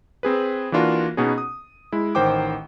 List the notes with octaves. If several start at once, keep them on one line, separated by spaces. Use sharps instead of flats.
C4 G#4 B4
E3 A#3 D4 F4 F#4 A#4
B2 B3 C#4 D#4 G#4
D#6
G#3 E4
A1 D#3 C5 G5 D6